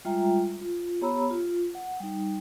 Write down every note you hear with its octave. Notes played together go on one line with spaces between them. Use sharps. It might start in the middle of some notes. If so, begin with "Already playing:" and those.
G3 G#3 F4 E5 G5 A#5
F4
B3 G4 C#5 A#5 B5 E6
F4
F#5
G3 D#4